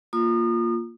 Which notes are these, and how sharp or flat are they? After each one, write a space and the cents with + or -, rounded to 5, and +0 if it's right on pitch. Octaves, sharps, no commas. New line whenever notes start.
A#3 +0 F4 +0 D#6 -35